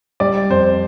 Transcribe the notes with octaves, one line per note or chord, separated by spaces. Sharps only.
G3 D5
F2 C5